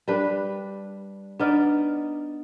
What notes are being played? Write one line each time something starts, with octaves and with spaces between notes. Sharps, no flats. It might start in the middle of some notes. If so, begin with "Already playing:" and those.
G3 D4 B4
B3 D4 D#4 D5 F6